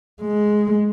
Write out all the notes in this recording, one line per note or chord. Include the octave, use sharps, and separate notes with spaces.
G#3